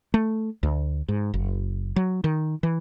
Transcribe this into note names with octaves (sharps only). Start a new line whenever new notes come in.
A3
D2
G#2
F#1
F#3
D#3
E3